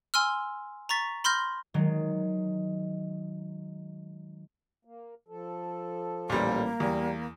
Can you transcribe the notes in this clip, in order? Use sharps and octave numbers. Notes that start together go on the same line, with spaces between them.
G#5 C6 E6 F6
A#5 C#6 A6 B6
B5 C6 F6 G6 A#6
D#3 F#3 G#3
A#3
F3 A4
A1 A#2 G3 A#3
E2 G3